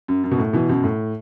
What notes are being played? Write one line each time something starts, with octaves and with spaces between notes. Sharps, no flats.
F#2
F#2
B2
A2
B2 E3
F#2 B2
A2